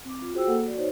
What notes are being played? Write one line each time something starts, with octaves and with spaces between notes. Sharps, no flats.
C4 D6
F4
F#4 G#4 C5 G5 E6
A#3 A4 F#5
F#4 D5
D#4 C5 C#5